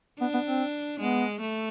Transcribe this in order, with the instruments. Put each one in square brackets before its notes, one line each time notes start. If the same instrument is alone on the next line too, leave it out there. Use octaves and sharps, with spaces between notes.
[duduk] B3 [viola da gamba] D4
[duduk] B3
C4
[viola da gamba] G#3 [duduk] B3
[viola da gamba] A3